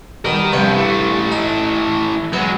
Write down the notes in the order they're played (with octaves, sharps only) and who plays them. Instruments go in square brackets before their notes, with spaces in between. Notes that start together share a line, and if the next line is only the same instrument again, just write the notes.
[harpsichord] B2 G3 [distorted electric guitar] A#4 D#5
[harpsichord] G2 B3 [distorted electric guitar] C3 F3
[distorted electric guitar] E3 A3
[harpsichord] D#4
[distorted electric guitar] F#3 G#3 [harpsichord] B3